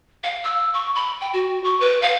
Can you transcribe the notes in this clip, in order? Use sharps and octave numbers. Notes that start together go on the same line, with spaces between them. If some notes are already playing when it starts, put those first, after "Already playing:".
F5
E6
C#6
B5
G5
F#4
C#6
B4
F5